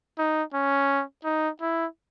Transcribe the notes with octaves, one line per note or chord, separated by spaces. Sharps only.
D#4
C#4
D#4
E4